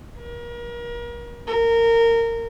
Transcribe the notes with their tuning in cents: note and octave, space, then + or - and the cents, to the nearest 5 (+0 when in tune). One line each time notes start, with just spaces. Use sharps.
A#4 +35
A#4 -20